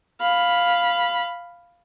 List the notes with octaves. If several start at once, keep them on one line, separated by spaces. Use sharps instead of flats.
F5 B5